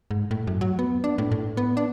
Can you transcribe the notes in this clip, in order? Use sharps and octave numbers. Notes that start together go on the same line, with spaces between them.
G#2
A2
F#2
F#3
B3
D4
A2
A2
B3
D4